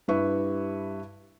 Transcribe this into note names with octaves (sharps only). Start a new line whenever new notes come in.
G2 G3 E4 B4 E5 C#6